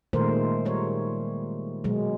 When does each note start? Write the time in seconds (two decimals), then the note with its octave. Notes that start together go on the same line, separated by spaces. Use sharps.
0.13 A#2 D#3 G#3 A3 A#4 C5
0.65 G3 A#4 C#5
1.84 B2 F#3 G#3